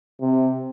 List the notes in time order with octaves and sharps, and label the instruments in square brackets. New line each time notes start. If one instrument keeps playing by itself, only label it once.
[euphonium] C3